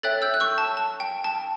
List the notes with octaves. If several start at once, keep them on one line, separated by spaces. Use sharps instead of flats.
A4 C#5 E5 G5 F#6 A6
E6 G6
F#6
C#6 E6
A5
A5
G5
A5